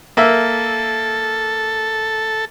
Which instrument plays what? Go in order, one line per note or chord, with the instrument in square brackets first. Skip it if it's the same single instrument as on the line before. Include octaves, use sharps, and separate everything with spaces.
[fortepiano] A#3 E5 [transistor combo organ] A4